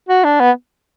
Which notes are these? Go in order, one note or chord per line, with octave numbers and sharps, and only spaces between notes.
F#4
D4
B3